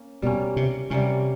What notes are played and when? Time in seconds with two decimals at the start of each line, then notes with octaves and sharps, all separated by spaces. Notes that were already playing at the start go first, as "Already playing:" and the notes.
Already playing: A#3 C#4
0.22 B2 G3 A#3 C#4
0.57 C3
0.90 C3 G3 A#3 C#4